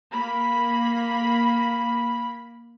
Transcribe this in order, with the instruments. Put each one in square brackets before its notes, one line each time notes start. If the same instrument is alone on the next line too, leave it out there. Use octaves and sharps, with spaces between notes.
[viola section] A#3 B5